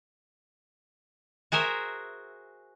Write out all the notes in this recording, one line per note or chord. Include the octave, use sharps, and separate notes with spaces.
F#4 G#4 A#4 C5 E5